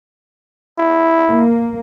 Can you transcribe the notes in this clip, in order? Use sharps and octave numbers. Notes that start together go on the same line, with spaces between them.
E4
A#3